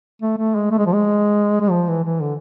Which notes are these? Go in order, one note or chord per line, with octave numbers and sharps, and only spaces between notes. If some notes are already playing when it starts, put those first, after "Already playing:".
A3
A3
G#3
A3
G#3
F3
G#3
G#3
F3
E3
E3
D3